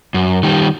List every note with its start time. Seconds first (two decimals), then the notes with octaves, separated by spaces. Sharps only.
0.14 F#2
0.43 D#3 G3